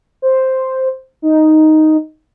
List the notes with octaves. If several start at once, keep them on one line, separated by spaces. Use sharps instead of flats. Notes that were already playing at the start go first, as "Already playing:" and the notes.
C5
D#4